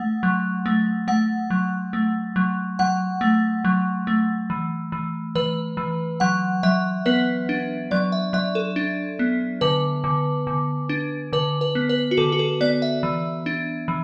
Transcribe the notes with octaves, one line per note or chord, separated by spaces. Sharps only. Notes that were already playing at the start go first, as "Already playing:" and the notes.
Already playing: A3 F#5
F#3
A3
A3 F#5
F#3
A3
F#3
F#3 F#5
A3
F#3
A3
E3
E3
E3 B4
E3
F#3 F#5
F#3 E5
B3 B4
D4
F#3 D5
E5
F#3 E5
A4
D4
B3
D3 B4
D3
D3
D4
D3 B4
B4
B3
B4
F#4
D3 A4
F#4
A4
B3 D5
E5
E3
D4
E3